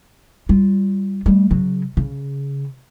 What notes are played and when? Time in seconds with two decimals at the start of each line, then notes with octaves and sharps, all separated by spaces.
0.49 G3 F4
1.26 G3 A3
1.51 C#3 F#3
1.97 C#3